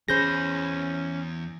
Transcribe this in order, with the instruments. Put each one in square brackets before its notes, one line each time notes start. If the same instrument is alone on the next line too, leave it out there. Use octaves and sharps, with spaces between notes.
[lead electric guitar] E2 B5 [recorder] C#4 [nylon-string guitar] G#4 C5 [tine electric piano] G6 A#6